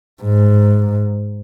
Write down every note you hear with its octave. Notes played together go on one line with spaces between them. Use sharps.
G#2